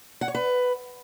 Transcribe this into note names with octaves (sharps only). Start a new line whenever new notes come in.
F#5
C#5
B4